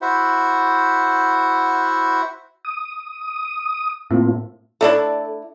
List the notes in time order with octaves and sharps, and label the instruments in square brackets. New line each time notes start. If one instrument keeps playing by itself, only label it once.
[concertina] E4 F#4 C5 E5 F#5
[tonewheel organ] D#6
[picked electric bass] A2 [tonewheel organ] A#3 C4 F4
[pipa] A3 D4 E4 [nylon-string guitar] A4 D5